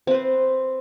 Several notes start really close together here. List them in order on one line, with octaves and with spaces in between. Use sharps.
C4 B4 C5